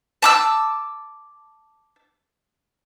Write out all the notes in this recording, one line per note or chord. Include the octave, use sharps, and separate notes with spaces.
A5 D6 E6